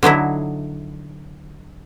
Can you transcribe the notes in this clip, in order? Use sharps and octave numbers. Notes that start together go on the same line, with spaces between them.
D3 F#3 D#4 E4